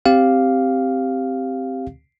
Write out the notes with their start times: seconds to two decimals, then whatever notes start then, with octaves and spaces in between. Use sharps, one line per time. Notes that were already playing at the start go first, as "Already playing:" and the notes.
0.06 C4 G4 F5